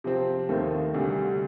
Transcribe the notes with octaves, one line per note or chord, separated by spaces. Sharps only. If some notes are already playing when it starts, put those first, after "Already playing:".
C3 F3 C4
D#2 D#3 A3 C4
D2 C3 G3